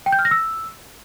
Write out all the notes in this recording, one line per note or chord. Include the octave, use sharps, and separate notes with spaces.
G5
G6
F6
A#6
E6